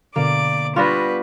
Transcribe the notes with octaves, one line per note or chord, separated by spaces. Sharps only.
B2 D3 A#3 D5 D6
G3 B3 D4 F4 B4 C#6 A#6